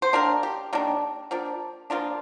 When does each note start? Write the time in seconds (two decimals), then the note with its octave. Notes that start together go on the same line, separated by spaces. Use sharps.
0.02 C5
0.13 D#3 A#3 D4 A#4
0.43 G4
0.73 D#3 A#3 D4
1.31 F3 A#3 D4
1.90 F3 A#3 D4 F4